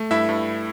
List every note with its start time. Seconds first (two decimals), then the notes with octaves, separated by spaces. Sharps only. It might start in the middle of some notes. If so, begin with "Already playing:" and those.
Already playing: A3
0.11 G2 E4 E5
0.29 G2